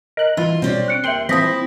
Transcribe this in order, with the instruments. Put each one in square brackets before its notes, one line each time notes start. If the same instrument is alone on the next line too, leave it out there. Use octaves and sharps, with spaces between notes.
[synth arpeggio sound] A#4 F#6 [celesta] D#5
[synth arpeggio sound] E3 E4 [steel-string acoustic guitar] F4
[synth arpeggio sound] B2 [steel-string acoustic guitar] C4 C#4 D5
[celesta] F#6 C#7 D7
[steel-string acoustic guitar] D#2 [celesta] E5 F#7 G7 [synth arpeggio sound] G5 C6
[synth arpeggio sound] E3 F3 [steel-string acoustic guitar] C4 E4 [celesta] D#6 A#6 B6